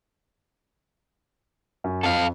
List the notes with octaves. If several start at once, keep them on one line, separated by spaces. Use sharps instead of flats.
F#2
F2 A4 F5